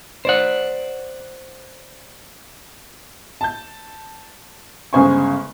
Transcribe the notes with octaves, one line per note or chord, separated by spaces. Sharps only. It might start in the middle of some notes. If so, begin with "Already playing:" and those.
C5 D5 F#5
A5 G6
G1 C#3 G#3 C5 G#5 C#6